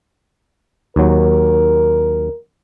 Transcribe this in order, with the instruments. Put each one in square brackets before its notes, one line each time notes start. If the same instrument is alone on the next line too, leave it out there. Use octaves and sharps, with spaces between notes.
[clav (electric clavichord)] D#2 F#3 [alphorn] A#4